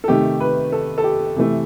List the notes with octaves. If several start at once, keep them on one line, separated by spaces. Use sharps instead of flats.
A4
C3 D#3 A3 G4
B4
A4
A4
G4
C3 E3 A3